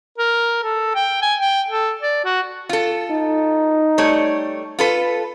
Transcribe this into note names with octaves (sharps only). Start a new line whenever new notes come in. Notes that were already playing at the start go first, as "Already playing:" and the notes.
A#4
A4
G5
G#5
G5
A4
D5
F#4
F4 A4
D#4
G3 A3 C#5
F4 A4 B4